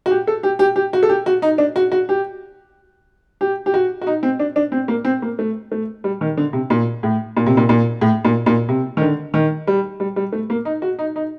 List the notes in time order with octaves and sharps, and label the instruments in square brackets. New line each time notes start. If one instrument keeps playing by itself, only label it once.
[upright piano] F#4
G4
A4
G4
G4
G4
F#4
A4
G4
F#4
D#4
D4
F#4
F#4
G4
G4
G4
F#4
F#4
D#4
C4
D4
D4
C4
A#3
C4
A#3
A3
A3
G3
D#3
D3
C3
A#2
A2
A#2
C3
A#2
A#2
A2
A#2
A#2
C3
D#3
D3
D#3
G3
G3
G3
A3
A#3
D#4
F#4
D#4
D#4